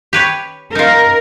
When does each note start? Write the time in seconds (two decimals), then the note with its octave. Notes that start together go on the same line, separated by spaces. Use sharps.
0.13 G4 B4 C#5
0.75 D#4 F4 A#4